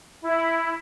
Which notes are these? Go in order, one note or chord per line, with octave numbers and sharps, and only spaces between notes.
E4